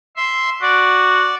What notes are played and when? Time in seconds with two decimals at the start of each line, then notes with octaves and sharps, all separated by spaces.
0.16 E5 C6
0.62 F#4 D5